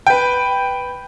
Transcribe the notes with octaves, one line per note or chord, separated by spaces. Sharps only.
B4 G5